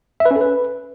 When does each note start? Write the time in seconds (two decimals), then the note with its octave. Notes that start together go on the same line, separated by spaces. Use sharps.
0.20 E5
0.25 B4
0.31 C#4
0.36 A4
0.41 B4